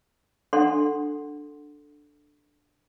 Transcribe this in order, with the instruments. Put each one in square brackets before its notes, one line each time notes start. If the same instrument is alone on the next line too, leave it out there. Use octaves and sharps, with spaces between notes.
[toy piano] D4 A4 F#5 C6